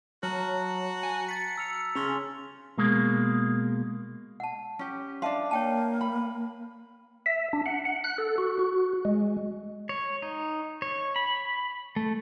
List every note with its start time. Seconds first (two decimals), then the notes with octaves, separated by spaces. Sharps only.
0.23 F#3 F#4 A5 A#5 F6
1.03 G#5
1.28 A6 B6 C#7
1.58 E6 F6 F7
1.95 C#3 C#4 C6 C#6 F7
2.78 B2 G#3 A#3
4.40 F#5 A5
4.79 C#4 G4
5.22 D4 E5 F5 A5 C6
5.51 A#3 C#5 G5 A5
6.01 B5
7.26 E5
7.53 D4
7.66 F#5
7.85 F#5
8.04 F#6
8.18 A4
8.38 F#4
8.59 F#4
9.05 G#3
9.89 C#5
10.22 D#4
10.82 C#5
11.16 B5
11.96 A3